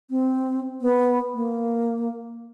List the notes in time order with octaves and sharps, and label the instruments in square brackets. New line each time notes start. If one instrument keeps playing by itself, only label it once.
[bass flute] C4
B3
A#3